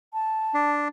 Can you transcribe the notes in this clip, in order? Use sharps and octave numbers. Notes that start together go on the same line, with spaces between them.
A5
D4